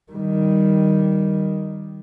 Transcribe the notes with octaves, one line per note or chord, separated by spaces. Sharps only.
D#3 G3